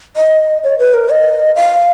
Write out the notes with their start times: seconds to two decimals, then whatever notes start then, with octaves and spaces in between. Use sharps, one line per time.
0.16 D#5
0.64 C#5
0.79 B4
0.94 A#4
1.09 D#5
1.55 F5